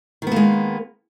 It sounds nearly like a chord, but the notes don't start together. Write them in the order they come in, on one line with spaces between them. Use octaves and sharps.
D#3 B3 A#3 G#3